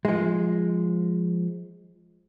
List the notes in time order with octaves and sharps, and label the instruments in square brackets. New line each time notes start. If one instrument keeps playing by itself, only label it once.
[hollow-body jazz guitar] F3 G#3